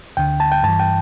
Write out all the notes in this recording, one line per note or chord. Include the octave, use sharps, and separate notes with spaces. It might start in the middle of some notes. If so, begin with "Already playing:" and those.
D2 D3 G5
A5
G5
G2 E3 A5
G5